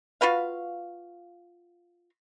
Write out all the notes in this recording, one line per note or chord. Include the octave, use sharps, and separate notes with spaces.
F4 F#4 B4 F5